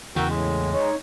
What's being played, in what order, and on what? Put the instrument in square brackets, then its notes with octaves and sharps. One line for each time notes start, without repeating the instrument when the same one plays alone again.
[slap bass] E2 C#3 E3 [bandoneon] F#4 G5 [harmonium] A#4 E5
[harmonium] A2 [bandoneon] G#3
[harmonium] D#4 C#5